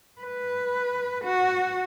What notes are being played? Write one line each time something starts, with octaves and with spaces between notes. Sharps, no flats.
B4
F#4